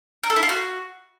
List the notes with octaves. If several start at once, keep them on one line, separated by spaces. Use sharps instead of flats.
A#4
A4
E4
F4
F#4